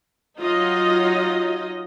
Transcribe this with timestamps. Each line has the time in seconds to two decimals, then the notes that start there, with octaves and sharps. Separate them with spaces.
0.41 F#3 D#4 F4 D#5